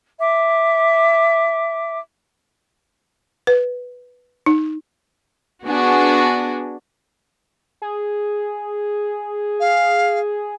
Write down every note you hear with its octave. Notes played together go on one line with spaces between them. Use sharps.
E5 D6
B4
D#4
B3 D4 F#4 G#4
G#4
F5